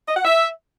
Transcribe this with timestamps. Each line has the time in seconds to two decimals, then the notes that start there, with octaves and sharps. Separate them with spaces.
0.08 D#5
0.17 F#5
0.25 E5